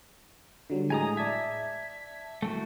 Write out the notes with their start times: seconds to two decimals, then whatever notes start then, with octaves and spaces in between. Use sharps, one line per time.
0.70 D3 F#3 G3
0.90 A2 G#3 G#5 A#5 D#6
1.17 D5 E5 A5 G#6
2.42 A3 E4 F#4